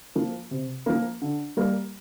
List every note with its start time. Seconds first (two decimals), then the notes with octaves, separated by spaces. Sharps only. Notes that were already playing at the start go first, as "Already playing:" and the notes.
0.15 F3 A#3
0.51 C3
0.86 F3 A#3
1.22 D3
1.57 G3 A#3